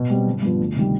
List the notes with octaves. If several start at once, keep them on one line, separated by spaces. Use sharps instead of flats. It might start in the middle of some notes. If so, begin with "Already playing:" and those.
Already playing: B2
G3 C4
G1
G2 F3 B3 F4
D2
C3 D#3 G3